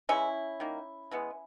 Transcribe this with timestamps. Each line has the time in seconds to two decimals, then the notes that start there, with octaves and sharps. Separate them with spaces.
0.09 C#3 E3 G#3 C#4 E4
0.60 D#3 A#3
1.11 E3 G#3 B3